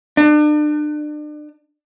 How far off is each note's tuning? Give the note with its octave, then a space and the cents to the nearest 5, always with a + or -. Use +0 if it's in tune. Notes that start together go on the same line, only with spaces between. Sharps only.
D4 +35